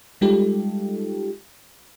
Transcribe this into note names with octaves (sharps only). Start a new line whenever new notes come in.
G3 G#3 D#4 F4 G4 A4